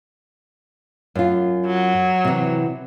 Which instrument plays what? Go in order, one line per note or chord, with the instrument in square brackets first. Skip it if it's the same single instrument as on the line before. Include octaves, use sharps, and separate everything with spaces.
[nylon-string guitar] F#2 F4
[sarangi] F#3
[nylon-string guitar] C3 E3